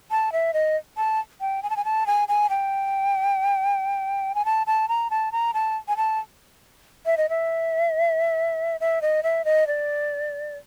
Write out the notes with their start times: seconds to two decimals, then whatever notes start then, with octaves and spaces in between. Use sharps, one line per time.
0.11 A5
0.32 E5
0.54 D#5
0.97 A5
1.41 G5
1.63 G#5
1.70 A5
1.76 G#5
1.85 A5
2.07 G#5
2.28 G#5
2.50 G5
4.35 G#5
4.45 A5
4.67 A5
4.89 A#5
5.10 A5
5.32 A#5
5.54 A5
5.88 G#5
5.97 A5
7.06 E5
7.17 D#5
7.29 E5
8.80 E5
9.02 D#5
9.23 E5
9.45 D#5
9.67 D5